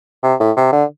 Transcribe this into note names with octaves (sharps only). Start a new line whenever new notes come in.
C3
A2
C3
D3